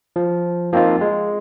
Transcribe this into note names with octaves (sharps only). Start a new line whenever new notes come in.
F3
F3 A#3 C4 D#4 F4
G#3